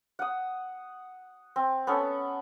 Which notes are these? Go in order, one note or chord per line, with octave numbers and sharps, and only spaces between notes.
F#5 D#6
C4
B3 C#4 A4